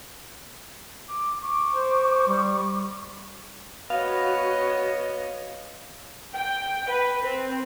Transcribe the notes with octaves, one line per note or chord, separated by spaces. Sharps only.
D6
C#6 D6
C5
G3
B3 F#4 C#5 D#5 F5
G5
B4
C4